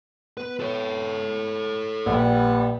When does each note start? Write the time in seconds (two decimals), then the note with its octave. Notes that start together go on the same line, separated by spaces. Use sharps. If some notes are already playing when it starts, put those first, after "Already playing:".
0.37 B3 B4
0.60 A4 C#5
2.06 A#1 G3 B3